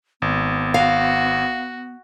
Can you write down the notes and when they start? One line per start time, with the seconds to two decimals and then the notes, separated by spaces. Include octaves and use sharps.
0.22 G#1 B3
0.74 F#4 F5